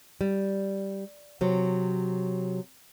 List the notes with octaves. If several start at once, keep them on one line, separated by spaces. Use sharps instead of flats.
G3
C3 F#3